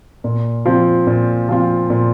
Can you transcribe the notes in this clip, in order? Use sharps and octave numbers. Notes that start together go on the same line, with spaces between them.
A#2
F3 C4 F4
A#2
F3 C4 F4
A#2